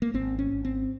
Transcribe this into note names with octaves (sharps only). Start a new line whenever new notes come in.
A#3
G#1 C4
C#4
G#1
C4